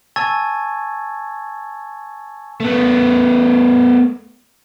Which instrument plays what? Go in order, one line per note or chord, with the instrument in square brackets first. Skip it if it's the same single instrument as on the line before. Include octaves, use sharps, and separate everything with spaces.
[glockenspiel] G#5 A5 C#6 E6 G#6 A6
[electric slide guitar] A3 B3